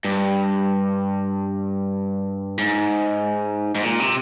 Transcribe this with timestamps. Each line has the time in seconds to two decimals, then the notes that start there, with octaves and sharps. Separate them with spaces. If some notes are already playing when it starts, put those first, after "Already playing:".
0.05 G2
2.58 G#2
3.75 G#2
3.83 A#2
4.00 C3